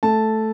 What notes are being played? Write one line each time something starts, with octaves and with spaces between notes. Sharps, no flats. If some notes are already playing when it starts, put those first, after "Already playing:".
A3 A5